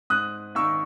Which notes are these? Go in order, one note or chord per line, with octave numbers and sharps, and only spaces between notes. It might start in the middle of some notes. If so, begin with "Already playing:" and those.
G#2 D#6 F#6
D#3 A#3 C#6 E6